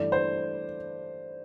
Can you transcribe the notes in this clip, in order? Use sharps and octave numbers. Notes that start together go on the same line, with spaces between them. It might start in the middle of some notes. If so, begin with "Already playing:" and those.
Already playing: G2 E3 A3 D5
C5